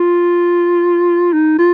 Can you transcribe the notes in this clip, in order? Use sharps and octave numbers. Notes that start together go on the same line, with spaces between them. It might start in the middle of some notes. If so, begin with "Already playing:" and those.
Already playing: F4
D#4
F4